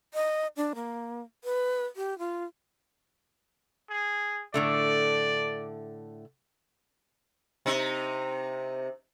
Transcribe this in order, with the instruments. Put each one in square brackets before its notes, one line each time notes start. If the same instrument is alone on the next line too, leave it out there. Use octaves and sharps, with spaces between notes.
[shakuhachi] D#5
D4
A#3
B4
G4
F4
[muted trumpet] G#4
[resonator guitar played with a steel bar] A2 D3 A3 [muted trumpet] D5
[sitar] C3 D#4